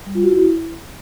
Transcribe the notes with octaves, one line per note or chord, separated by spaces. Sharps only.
G3
F4
F#4
E4